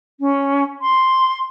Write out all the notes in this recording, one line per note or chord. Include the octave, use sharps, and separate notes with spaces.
C#4
C6